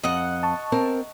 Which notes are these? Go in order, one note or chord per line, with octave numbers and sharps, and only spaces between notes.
F2 D#5 F#5
A5 C#6
C4 A#4